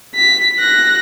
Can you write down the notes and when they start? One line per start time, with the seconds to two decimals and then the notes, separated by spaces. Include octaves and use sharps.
0.15 B6
0.59 F#6 A#6